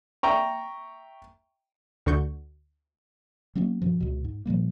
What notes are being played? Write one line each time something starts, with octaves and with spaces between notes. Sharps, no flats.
E5 G5 A#5 C#6
D2 D3 F#4 C#6 G6
F#3 A#3 B3 C#4
G2 B2 F3
C#2 B2
G#2
A#2 F3 G3 A#3